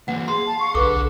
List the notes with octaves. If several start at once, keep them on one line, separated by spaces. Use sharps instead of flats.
E3 A#3 F#5
G#4 F5 C6
A5
C#6
B1 D3 G#4 A4 B4 D6